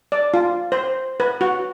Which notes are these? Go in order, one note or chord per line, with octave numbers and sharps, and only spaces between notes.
D5
F4
C5
B4
F#4